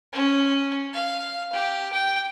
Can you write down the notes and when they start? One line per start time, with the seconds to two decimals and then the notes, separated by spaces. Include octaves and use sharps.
0.13 C#4
0.93 F5
1.53 G4
1.93 G5